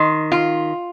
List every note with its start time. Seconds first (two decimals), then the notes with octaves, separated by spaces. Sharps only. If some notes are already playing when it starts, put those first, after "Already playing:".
Already playing: D#3 C6
0.32 F4